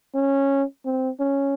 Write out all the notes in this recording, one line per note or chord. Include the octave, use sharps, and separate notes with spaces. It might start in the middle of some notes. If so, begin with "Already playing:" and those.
C#4
C4
C#4